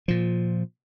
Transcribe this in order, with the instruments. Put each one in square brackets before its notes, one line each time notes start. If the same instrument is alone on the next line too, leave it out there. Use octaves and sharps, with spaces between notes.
[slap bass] A#2 F3